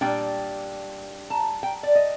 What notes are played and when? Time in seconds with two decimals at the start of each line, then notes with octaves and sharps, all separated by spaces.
0.01 A#2 G3 A#3 D4 G5
1.30 A5
1.63 G5
1.83 D5
1.95 D#5